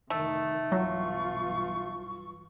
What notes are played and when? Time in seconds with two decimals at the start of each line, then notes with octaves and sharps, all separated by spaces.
0.10 F1 D#3 A3
0.72 B1 G2 E3 F#3 F4 C#6